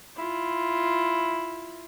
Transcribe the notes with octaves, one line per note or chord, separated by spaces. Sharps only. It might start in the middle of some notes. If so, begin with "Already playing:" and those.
E4 F4